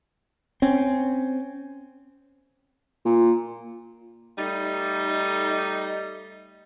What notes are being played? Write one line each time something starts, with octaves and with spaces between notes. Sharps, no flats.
C4 C#4
A#2
G3 A3 D#4